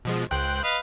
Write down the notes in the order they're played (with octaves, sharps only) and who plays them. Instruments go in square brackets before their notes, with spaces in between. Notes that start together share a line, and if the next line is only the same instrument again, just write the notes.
[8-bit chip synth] B2 F3 G#3
[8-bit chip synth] C#2 G5 F#6 [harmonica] C5
[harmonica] B4 D#5 F5